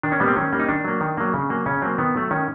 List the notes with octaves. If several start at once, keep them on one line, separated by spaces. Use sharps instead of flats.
D#3 D4
C#4
G3 A#3 B3
C4
D#3 C#4
G3 A#3
D#4
D#3 D4
F#3 A#3
D#3
F#3 A#3
C#3
F#3 A#3
C#3 C#4
F#3 A#3 C4
D#3 B3
F#3 A3
D#3 C#4